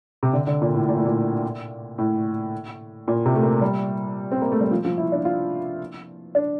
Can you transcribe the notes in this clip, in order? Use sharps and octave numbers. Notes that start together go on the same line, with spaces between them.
C3
D3
D3
A#2
A2
A#2
A2
A#2
A2
A#2
C3
A3
A#3
G3
C4
A#3
A3
G3
F3
F3
E4
D4
F4
D4